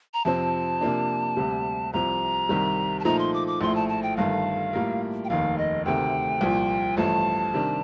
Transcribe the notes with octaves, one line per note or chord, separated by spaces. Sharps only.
A#5
F2 C3 F3 C4 A5
C3 F3 A#3 D4
D2 C3 G3
C2 C3 F3 A#5
C2 C3 D#3 G3
A5
A#2 F3 A3 D#4 A#5
C6
D6
D6
A#1 A2 F3 A3 C6
A5
A5
G5
G1 G2 D#3 A3 F5
A2 G3 A#3 F4 A#4
G5
F1 D#2 D#3 F5
D#5
D2 C3 D#3 A3 G5
C2 A#2 F3
A1 G2 F3 A3 A5
C3 D#3 G3 D4